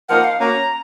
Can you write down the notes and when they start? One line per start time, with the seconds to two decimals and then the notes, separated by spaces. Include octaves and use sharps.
0.09 F3 A#3 D#4 A#4 F#5
0.24 F5
0.40 A#3 C#4 F#4 A#5